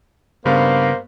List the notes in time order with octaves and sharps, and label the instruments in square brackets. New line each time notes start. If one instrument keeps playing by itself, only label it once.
[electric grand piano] G2 B3 F5 [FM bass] C#3 [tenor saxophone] A#3 [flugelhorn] C5